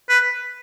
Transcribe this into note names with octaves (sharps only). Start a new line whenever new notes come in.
B4